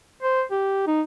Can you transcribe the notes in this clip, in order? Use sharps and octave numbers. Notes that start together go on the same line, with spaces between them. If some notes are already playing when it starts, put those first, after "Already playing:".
C5
G4
D#4